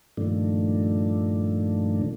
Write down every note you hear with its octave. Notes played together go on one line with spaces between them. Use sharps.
G2 A#2 D#3 F3 A3 D4